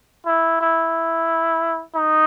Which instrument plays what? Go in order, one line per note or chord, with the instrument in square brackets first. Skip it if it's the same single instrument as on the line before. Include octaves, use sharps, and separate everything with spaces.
[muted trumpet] E4
E4
D#4